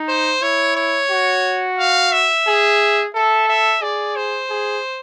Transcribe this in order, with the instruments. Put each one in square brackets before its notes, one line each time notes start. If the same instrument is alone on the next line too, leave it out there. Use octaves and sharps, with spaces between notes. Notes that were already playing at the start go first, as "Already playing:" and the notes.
Already playing: [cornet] D#4
[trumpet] C5
[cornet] E4 [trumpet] C#5
[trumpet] C#5
[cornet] F#4
[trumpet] F5
E5
[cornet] G#4
[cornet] A4 [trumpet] E5
[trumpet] E5
[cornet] G#4 [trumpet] D5
[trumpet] C5
[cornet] G#4